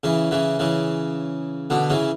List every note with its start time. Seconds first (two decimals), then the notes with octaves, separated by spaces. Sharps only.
0.03 C#3 E3
0.31 C#3 E3
0.59 C#3 E3
1.70 B2 D3
1.90 C#3 E3